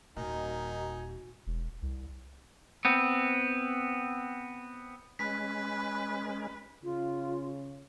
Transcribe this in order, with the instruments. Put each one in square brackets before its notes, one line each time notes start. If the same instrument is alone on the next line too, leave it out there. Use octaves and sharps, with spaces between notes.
[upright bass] D#1 A#2 [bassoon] D#3 [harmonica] D#4 G#5 [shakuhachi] F#4
[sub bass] E1
C2
[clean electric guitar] B3 C4
[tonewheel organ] G#3 C#4 [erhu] B4 [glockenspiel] B6
[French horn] C#3 [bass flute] F4